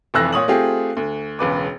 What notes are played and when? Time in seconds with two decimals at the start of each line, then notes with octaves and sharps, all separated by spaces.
0.14 F1 F2 E3 E6 F#6 A#6
0.33 A#2 C#5 D#6 F#7
0.48 A3 C4 F4 G4 G#4
0.97 D2
1.39 E1 C#2 B4 D6